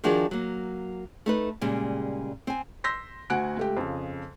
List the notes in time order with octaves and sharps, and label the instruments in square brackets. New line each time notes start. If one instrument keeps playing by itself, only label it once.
[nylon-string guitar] D#3 F3 D4 F#4 G#4 A#4
F#3 A#3
A3 D#4 B4
A#2 C#3 G3 G#3
C4 G#5
[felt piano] C6 E6 G6 A#6 B6
D2 F#4 F#5 G#5 F#6 D7
C#2 A3 G4
F2 C#3